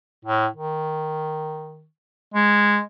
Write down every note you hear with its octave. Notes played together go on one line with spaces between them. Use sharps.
A2
D#3
G#3